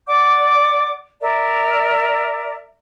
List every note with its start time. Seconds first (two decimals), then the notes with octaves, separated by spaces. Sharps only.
0.07 D5 F#5 D6
1.20 A#4 D5 E5